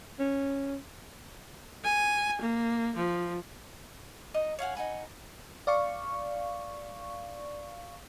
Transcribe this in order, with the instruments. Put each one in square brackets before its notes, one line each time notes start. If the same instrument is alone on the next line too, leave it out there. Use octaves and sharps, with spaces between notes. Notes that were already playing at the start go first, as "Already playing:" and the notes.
[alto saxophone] C#4
[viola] G#5
A#3
F3
[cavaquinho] D#4 D#5 A#5
C#5 F5 F#5 G#5
D#4 F#5 G#5 B5
[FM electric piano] D5 F5 C#6